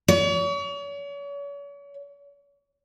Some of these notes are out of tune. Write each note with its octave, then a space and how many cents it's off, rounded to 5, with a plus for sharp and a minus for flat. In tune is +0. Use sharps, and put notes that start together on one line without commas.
C#5 +40